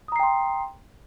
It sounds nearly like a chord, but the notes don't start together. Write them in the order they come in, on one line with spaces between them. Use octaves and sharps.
D#6 A#5 C7 G5 C6